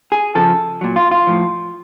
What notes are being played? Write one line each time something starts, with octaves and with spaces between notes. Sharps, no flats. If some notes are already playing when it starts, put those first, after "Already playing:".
G#4
C#3 F3 A4
A#2 F#3
F4
F4
A2 F3